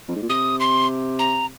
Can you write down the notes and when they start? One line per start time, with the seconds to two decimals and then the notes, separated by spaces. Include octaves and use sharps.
0.08 F2
0.16 G#2
0.22 A#2
0.29 C3 D#6
0.60 C6
1.19 A#5